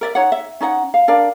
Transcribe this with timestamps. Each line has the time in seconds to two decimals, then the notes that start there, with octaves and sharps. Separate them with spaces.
0.01 A#4 D5 E5
0.15 D#4 C#5 F#5
0.32 E5
0.60 C#4 D#4 D5 F#5
0.94 F5
1.08 D4 A#4 D5 F5